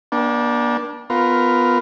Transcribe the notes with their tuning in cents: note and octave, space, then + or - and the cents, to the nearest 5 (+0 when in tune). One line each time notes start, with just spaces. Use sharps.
A#3 +45 D4 +0 G5 +0
B3 +15 F4 +10 A#4 +0